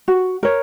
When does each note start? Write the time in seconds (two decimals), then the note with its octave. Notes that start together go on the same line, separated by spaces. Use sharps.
0.08 F#4
0.43 A#4 C#5